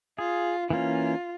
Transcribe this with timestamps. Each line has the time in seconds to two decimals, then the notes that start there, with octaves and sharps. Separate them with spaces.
0.19 F4 G#4
0.70 E3 A#3 C#4 F4